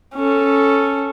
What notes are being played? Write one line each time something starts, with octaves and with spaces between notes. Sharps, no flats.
C#4 A4